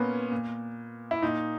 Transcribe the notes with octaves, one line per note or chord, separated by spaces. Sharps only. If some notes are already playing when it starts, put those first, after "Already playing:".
Already playing: A#2 A#3 B3 C#4
A#2
E4
A#2 D#4